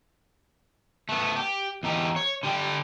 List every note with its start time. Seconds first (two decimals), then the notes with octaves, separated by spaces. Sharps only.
1.09 A3 B3
1.36 G4
1.83 E2 D#4 G4
2.16 C#5
2.43 D3 G4 D5 G5